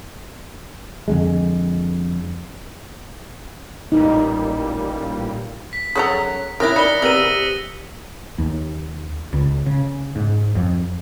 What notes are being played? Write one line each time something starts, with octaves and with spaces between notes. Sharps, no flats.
F2 D3 G#3
A1 A#2 G3 D#4
B6
F#2 G#4 A4 C#5 F#5 A#5
D#3 C#4 E4 A#4 D#6 F#6 A#6
D#4 A#4 D5 B5 C#7 G7
C3 G#3 B3 A#4 E6 A#6 D#7
D#2
C#2
C#3
G#2
F2